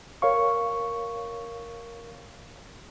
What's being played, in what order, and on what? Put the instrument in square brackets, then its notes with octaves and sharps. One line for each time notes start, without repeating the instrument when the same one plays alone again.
[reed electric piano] A#4 C#5 F5 C#6